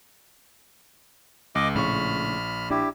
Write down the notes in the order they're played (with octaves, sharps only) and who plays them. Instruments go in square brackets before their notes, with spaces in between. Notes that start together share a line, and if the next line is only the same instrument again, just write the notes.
[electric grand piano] C#2 [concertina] D#5 D6
[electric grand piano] A#1 C#6 [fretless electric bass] A2 C#3 [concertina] B5 F6
[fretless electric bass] D4 [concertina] E4 G4